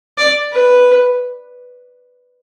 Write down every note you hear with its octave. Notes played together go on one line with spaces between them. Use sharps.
D5
B4